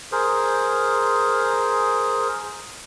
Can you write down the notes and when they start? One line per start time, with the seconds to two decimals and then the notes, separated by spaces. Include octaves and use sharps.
0.12 G#4 A#4 C5